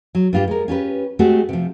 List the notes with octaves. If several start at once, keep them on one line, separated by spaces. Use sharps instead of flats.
F#3
G2 F4 G4
G#3 A#4
C#4 F4 G4 B4
G#3 A3 C4 F#4 G4
C3 F3